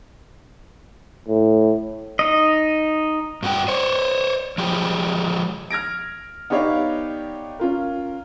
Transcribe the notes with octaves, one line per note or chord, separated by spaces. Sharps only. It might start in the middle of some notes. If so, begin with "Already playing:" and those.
A2
D#4 D#5
G2 F#4 G#4 G5
C5 C#5
F3 G#3 G4
F6 G#6 A#6 D7
B3 D#4 G4 C#5 D5 F5
C#4 F4 A#4